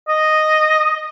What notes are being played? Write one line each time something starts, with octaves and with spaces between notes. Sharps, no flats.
D#5